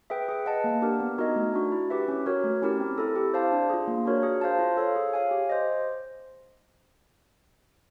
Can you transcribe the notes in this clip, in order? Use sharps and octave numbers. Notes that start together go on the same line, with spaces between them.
G#4 B4 E5 G5
G#4
B4 D#5 F#5 A5
A#3
D4 G4 A#4
B3
D#4 F#4 A#4 D#5
A3
D4 F#4
E4
G4 B4 E5
C#4
F#4 A#4 C#5
A3
C#4 E4 G4 A#4
C4
E4 A4
G4
C5 F5 A5
D4
F4 G#4
A#3
D4 F#4 A#4 C#5
G#4
C5 F5 A5
F4
A4 C#5 F5
G#4
C#5 F5 G#5
G4
C5 D#5